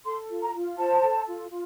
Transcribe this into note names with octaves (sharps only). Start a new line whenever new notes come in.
A4 C6
F4
A#5
F4
C5 A5
A4
F4
F4